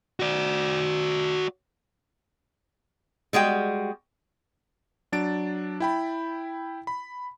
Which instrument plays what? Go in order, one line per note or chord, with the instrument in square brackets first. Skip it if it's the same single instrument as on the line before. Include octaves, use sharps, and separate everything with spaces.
[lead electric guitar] F#4 D5
[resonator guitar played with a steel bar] G3 G#3 F#4 G5
[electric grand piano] F#3 D4 A6 D7
E4 G5 B5
B5